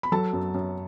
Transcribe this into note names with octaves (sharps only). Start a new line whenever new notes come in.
B5
F#3 A4 A5
F#2
F#2